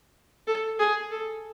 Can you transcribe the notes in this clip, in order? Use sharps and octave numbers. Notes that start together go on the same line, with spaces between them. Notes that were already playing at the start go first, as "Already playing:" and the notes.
A4
G#4
A4